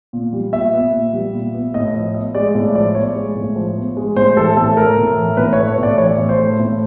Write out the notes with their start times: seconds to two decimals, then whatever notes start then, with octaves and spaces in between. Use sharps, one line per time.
0.13 A#2
0.33 G3
0.53 A#2 E5
0.73 B3
0.93 A#2
1.13 G3
1.33 A#2
1.54 B3
1.74 A2 D#5
1.94 F3 D#5
2.14 B3 D#5
2.35 G#3 D5
2.55 A2
2.75 F3 D5
2.95 B3 C#5
3.15 G#3
3.35 A2
3.56 F3
3.76 B3
3.97 G#3
4.16 A2 C5
4.37 E3 A4
4.57 A2 A4
4.77 A3 A#4
4.97 A2
5.17 E3
5.37 A2 B4
5.53 C#5
5.58 A3
5.68 C#5
5.78 A2 D5
5.98 E3 C#5
6.18 A2
6.29 C5
6.39 A3
6.59 A2